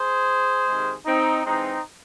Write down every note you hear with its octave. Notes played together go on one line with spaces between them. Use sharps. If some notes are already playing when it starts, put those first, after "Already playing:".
Already playing: G#4 C5
C3 D#3 G#3
C4 D#4
C3 E3 G#3 C4 D#4